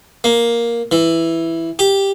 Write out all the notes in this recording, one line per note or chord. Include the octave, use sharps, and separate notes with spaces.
A#3
E3
G4